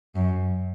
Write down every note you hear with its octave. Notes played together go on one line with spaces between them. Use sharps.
F#2